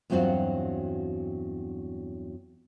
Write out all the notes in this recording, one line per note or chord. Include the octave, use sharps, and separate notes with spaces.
E2 G2 F#3 C4 F4 F#4